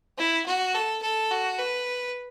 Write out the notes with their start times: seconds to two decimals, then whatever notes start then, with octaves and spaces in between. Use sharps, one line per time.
0.18 E4
0.46 F#4
0.74 A4
1.02 A4
1.31 F#4
1.58 B4